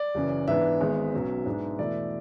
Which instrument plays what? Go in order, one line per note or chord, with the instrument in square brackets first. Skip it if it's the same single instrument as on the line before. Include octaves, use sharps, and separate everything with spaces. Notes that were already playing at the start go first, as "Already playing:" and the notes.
Already playing: [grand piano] D5
F#1 F#2 E3
G#2 E3 B3 D4 E5
G#1 G#2 G#3 B3
B1 B2 F#3 C#4
G#2 G#3 B3 D4
E2 B2 A3 E4 D5